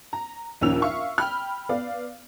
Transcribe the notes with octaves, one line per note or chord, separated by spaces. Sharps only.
A#5
A#1 D#2 C#4 E6 F7
E5 F5 C#6
G5 B5 F6
B3 D5 F5